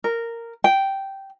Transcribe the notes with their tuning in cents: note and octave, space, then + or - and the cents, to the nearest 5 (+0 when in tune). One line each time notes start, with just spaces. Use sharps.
A#4 -10
G5 -10